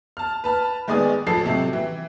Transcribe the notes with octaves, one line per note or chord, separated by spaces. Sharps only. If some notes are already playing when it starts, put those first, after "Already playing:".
A5 F6
B4 A5 F6
D#3 G#3 B3 D5 G#5 D#6
A1 F3 A4 C7
C3 F#3 G4
E3